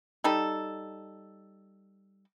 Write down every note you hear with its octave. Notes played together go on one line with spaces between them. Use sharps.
G3 D#4 A4